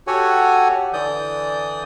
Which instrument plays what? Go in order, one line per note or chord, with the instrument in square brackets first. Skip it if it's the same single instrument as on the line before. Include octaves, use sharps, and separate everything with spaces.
[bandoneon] F#4 G4 A4 C#5 F#5 G#5
D3 E3 D5 D#6 G6